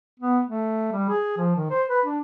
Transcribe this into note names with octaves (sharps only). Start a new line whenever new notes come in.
B3
A3
G3
G#4
F3
D#3
C5
B4
D4